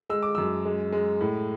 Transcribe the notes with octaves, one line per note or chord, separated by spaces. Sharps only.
G#3 E6
D6
F#2 E6
G#3
G#3
A2